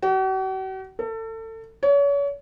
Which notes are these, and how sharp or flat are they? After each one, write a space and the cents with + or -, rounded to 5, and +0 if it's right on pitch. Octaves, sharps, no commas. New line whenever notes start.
F#4 +45
A4 +30
C#5 +35